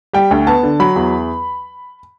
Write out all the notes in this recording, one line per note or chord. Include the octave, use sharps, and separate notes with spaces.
G3 G5
D2
B3 A5
D3
F#3 B5
E2